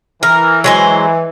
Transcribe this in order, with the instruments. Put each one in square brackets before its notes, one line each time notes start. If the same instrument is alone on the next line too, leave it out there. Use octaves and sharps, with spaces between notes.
[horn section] E3 [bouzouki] A#4
[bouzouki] F#3 G#3 C5